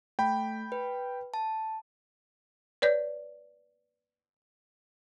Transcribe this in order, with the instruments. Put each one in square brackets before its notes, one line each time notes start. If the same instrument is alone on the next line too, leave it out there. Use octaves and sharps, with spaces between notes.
[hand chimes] A3 [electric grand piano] G5 B5
[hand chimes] B4
A5
[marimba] B4 C#5 D5 G6